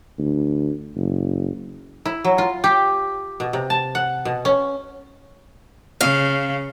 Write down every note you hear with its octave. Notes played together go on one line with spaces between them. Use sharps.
D2
F#1
E4
F#3
F4
G4
B2
C3
A5
F#5
B2
C#4
C#3 F5